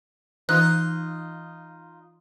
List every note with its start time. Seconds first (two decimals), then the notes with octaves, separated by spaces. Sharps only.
0.49 E3 D#4 F4 F#6